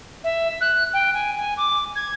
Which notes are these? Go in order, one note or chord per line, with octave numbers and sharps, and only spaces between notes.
E5
F#6
G5
G#5
G#5
D6
G#6